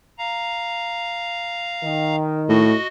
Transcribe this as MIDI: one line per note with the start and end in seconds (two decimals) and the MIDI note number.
0.18 2.16 77
0.18 2.16 82
1.83 2.64 51
2.49 2.75 45
2.49 2.87 66
2.49 2.87 75